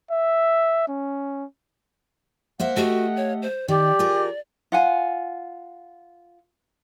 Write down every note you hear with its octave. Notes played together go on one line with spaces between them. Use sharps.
E5
C#4
A#3 C5 E5 F#5
A3 F#4 G4 D#5
C#5
C5
D#3 G4 D5
F4 G#4 A#4
F4 F#5 G#5